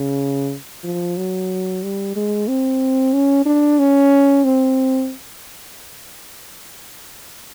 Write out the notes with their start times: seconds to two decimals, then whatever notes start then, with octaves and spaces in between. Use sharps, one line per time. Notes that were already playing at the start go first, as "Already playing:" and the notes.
Already playing: C#3
0.84 F3
1.17 F#3
1.83 G3
2.16 G#3
2.48 C4
3.14 C#4
3.46 D4
3.79 C#4
4.44 C4